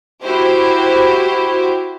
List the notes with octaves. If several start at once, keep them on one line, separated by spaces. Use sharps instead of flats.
E4 F#4 G4 C5